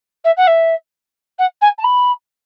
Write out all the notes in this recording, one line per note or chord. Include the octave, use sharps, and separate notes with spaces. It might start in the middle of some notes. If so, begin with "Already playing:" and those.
E5
F#5
E5
F#5
G#5
A5
B5